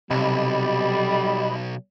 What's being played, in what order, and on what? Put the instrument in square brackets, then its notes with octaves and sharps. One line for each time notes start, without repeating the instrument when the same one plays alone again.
[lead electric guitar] B1 [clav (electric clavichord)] C3 [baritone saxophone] G3 [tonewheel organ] D#5 B5